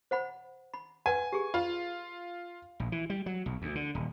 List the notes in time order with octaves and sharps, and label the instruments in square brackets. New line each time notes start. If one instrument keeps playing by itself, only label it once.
[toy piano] C5 F#5 B5
B5
[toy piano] B4 F#5 [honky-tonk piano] G#5
[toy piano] G4 G#4
[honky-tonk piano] F4 [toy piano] B5 C6
[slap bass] A#1
E3
G3
F#3
B1
D2
D3
D#1